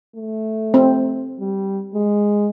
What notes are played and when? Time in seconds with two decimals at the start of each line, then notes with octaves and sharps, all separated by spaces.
0.15 A3
0.74 C4
1.40 G3
1.94 G#3